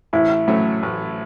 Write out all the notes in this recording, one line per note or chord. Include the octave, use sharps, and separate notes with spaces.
A1 E4
A2 F#3 A3 C#4
A1